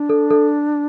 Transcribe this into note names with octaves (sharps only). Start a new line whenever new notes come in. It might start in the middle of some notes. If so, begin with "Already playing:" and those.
Already playing: D4
A4
A4